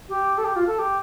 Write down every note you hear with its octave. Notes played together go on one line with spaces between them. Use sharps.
G4
A4
G4
F4
A4
G4